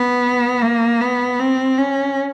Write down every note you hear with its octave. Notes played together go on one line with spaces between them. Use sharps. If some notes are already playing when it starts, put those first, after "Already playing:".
Already playing: B3
A#3
B3
C4
C#4